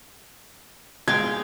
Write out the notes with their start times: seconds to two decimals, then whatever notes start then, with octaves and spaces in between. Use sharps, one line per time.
1.08 G#3 F5 G5 G#6